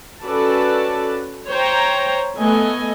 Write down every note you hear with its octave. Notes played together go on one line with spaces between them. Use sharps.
C#4 F#4 A4 B4 D5 A5
C5 C#5 G5 A#5
A3 B3 D#5 G#5